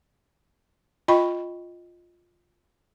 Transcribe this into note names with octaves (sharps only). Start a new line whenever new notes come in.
F4 D#5 G5 B5 C#6